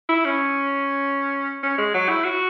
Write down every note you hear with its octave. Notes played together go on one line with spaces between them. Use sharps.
E4
C#4
C#4
G#3
F#3
E4
F#4